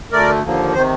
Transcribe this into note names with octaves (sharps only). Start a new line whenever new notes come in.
D2 D3 A3 A#4 D5
D#2 D3 F3 A#3
C3 D#3 C5